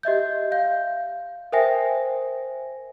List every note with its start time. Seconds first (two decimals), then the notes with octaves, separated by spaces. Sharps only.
0.03 G4 D#5 E5 G6
0.52 F5 G6
1.52 A#4 C5 E5 G5 G#5 A#6